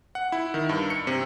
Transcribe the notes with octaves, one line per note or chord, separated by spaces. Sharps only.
F#5
E4
D#3
G2
C#7
C3